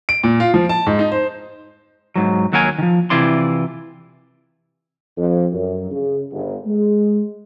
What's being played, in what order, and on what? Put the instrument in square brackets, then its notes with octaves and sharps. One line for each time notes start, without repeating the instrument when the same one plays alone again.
[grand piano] D7
A#2
F4
F3
A5
G#2
D#4
C5
[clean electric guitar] G#2 F#3
D#2 F#3 F#4 A#4 G#5
D#3 F3
C3 E3 E4 F4 D5 C6
[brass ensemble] F2
F#2
C#3
G1
G#3